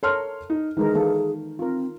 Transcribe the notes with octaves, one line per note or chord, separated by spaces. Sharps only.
A4 A#4 C#5 C6 F6
D#4
D#3 E3 G#3 G#4 A#4
E3 A#3 A4
C4 F4 A#4